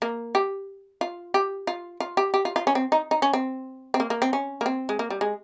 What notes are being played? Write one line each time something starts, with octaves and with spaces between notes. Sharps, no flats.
A#3
G4
F4
G4
F4
F4
G4
G4
F4
F4
C#4
C4
D#4
D#4
C#4
C4
C4
A#3
A#3
C4
C#4
A#3
C4
G#3
A#3
G3
G#3